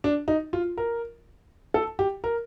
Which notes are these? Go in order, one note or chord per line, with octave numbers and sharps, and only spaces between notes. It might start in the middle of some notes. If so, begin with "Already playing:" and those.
D4
D#4
F4
A#4
A4
G4
A#4